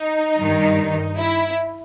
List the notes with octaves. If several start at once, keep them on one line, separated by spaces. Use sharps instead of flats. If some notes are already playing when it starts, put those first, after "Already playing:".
Already playing: D#4
G2 D#3
E4